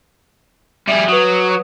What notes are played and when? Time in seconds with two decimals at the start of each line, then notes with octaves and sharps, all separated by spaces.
0.88 G3 G#4 E5
1.08 F#3 B4 D#6